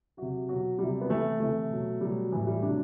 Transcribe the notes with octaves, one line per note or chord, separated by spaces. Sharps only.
C3 F#3 F#4
B2 F#3 F#4
C3 F#3 G3
B3
C3 E3 A3
C3 E3 A3
B2 F#3
B2 F#3 G3
A2 E3 G3
G3
C3 F#3 D4